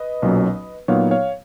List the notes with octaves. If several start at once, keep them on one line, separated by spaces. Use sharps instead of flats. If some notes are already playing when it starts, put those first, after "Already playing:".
Already playing: B4 D#5
B1 A#2 F#3 C#4
A#2 F#3 B3 D#4 C#5 F5
C#5 F5